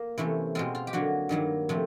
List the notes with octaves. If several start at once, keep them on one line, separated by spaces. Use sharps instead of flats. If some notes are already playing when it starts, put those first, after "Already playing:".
Already playing: A#3
C3 E3 A3 C#4
B2 G#3 C4 F4
F4
G4
D3 F#3 A#3 F#4
G2 D#3 F#3 A#3
C3 F3 A3 C4